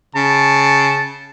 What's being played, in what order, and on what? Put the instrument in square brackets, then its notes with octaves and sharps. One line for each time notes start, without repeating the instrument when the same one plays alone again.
[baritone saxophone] C#3 [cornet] A5